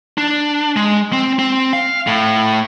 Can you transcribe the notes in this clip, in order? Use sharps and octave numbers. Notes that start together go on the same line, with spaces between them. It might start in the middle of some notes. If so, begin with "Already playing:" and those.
D4
G#3
C4
C4
F5
A2